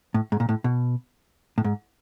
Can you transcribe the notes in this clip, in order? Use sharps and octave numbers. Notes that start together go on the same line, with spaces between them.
A2
G#2
A#2
A2
B2
A2
G#2